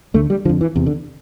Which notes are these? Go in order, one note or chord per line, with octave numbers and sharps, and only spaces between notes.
D2 D3 A3
G3
F2 D3 F3
E3
E2 C3
D3